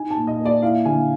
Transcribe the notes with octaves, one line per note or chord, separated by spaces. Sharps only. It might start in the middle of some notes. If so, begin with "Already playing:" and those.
Already playing: D#4 G#5
A5
A#2
D#5
A#3
D5
E4 F5
D3 G#5